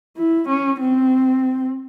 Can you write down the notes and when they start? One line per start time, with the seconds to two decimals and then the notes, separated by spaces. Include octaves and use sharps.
0.17 E4
0.49 C#4
0.80 C4